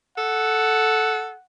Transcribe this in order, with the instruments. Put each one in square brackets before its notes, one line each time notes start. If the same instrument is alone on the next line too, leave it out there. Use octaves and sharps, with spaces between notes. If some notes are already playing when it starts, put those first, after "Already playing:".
[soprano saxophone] A4 [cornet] F#5